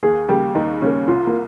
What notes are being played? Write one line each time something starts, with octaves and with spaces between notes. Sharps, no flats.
D#2 G#4
C#3 G3 A#3 G4
D#2 D#4
C#3 G3 A#3 C#4
C2 F4
A#3